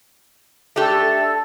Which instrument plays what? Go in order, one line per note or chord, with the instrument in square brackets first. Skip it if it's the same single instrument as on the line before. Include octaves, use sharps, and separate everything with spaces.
[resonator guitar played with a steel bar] A3 D4 G4 [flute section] A4